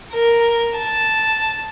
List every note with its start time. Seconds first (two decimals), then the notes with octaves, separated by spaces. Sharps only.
0.13 A#4
0.76 A5